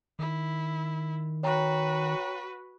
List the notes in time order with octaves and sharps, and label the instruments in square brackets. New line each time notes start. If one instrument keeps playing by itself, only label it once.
[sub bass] D#3 [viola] E4
[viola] F#4 B4 [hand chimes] C#5 G5 A#5